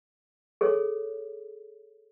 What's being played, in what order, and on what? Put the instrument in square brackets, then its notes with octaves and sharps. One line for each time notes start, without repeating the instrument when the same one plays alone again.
[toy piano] G#4 A4 C#5